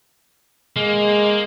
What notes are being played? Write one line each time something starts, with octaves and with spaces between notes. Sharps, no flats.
G#3 A#3